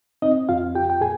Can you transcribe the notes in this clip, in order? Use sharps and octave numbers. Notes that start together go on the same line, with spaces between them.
C4 D#4 D#5
F2 F4 F5
F4 G4 G5
G5
A#2 G#4 G#5